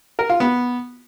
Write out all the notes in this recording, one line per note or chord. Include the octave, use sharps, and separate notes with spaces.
A#4
F4
B3